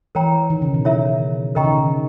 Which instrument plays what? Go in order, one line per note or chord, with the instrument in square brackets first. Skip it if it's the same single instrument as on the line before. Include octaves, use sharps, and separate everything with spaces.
[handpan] E3 [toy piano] A#4 C#5 G5 A#5
[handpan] D#3
C#3
B2
[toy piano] E4 A#4 C#5 E5
[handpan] C#3 [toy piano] A#4 D#5 G5 A#5 C#6
[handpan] D#3
C#3